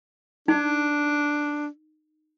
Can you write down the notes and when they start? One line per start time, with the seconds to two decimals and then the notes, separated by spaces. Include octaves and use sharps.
0.48 D4 D#4